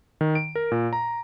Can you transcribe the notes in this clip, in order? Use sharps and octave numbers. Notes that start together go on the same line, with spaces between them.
D#3
D7
A#4
A#2
A#5